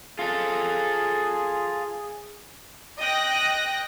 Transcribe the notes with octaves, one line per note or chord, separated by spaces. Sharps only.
F4 G#4 A4
D#5 G5 F#6 A#6